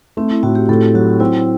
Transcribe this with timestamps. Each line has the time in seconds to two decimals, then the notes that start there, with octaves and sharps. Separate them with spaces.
0.17 A3 C4
0.30 E4
0.43 A2 F#4
0.55 G4
0.69 A2 A4
0.94 F#3 F#4
1.20 C4 E4